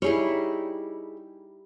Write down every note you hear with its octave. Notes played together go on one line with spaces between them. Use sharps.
G3 D#4 E4 G#4 C#5